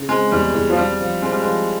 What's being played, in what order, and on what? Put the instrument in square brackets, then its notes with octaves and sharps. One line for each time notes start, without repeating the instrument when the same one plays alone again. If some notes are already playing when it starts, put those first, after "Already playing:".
Already playing: [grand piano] C#3
[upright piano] G#3 [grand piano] C4
[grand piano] E2 [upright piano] G3
[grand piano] E2
[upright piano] F3
[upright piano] G3 [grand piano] C4
[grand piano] F3
[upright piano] G#3 [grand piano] C4
[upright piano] G3
[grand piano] F3 [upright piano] G#3